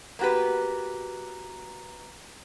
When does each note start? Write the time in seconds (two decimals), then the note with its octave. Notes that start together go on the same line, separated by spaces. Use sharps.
0.19 A#3 B3 F#4 G4 B4